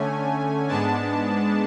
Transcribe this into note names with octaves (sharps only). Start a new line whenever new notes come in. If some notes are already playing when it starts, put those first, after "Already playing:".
Already playing: D3 A3 C#4 G#5
G#2 G#3 B3 D4 A5